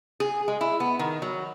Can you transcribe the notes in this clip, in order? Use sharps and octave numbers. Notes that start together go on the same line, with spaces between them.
G#4
G#3
E4
B3
D#3
F#3